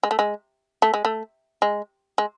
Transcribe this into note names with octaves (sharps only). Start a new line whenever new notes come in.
G#3
A3
G#3
A3
G#3
A3
G#3
G#3